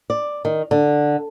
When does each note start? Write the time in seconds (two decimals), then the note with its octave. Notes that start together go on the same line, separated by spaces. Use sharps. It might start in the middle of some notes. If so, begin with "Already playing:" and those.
0.10 D5
0.45 D#3
0.71 D3